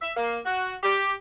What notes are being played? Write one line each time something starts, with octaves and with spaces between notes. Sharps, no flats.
E5
A#3
F#4
G4